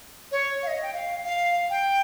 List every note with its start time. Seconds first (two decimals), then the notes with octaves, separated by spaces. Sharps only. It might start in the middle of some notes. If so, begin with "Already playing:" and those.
0.32 C#5
0.63 F5
0.68 D#5
0.82 G5
0.94 F5
1.23 F5
1.70 G5